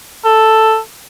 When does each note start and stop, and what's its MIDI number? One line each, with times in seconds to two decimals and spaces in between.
0.25 0.78 69